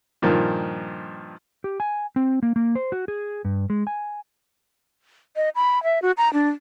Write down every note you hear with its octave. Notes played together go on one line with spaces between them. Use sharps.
G2 A#2 D#3 F3
G4
G#5
C4
A#3
A#3
C5
F#4
G#4
G2
G#3
G#5
D#5
B5
E5
F#4
A#5
D4